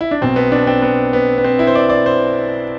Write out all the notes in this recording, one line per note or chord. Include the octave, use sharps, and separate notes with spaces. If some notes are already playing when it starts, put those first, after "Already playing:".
E4
D4
B1 B2 C4
B3
D4
C4
B3
B3
B3
C4
E4
C5
D5
D5
C5